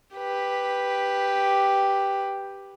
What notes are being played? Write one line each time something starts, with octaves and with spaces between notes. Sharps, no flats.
G4 B4